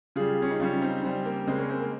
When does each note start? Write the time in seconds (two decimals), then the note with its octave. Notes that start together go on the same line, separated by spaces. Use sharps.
0.16 C#3 G3 F4 G#4
0.42 C#4
0.51 D#4
0.60 C#3 G3 C#4 F4
0.82 C4 D#4
1.03 C#3 G3 C4
1.25 A#3
1.47 C#3 G#3 C4
1.58 A#3 C#4
1.69 C4
1.80 A#3